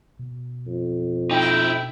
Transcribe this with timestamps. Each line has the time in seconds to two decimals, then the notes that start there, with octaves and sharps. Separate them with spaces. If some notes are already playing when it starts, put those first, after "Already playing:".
0.19 B2
0.67 F2
1.31 D#4 E4 G5